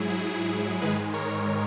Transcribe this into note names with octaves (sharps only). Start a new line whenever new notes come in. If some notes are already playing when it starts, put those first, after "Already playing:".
Already playing: G#2 F#3 E4 G#4
G#2 D#3 G#3 G#4 B4
A#4 C#5